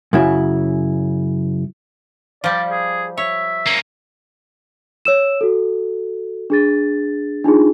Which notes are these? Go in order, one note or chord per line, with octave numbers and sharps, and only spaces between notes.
F#2 C#3 E4
F3 G3 D5
G#4
C#5 E5
A#3 C#4
C#5 E6 E7
F#4 A4
D4 G#4 A6
D4 D#4 F4 G#4